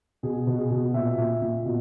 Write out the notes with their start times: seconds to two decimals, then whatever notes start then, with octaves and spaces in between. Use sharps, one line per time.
0.23 B2 G#4
0.47 B2
0.59 G#4
0.71 B2
0.94 A#2 E5
1.18 A#2
1.42 A#2
1.66 B2